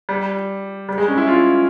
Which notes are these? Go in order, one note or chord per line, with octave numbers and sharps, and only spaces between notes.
G3
G3
G#3
C#4
E4
F4